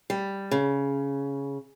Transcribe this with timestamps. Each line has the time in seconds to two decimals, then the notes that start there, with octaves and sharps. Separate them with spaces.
0.10 G3
0.51 C#3